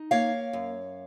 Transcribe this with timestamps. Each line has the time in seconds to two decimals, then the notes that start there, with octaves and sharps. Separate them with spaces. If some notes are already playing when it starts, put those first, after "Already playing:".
Already playing: D#4
0.11 A#3 C#5 F5
0.53 F#2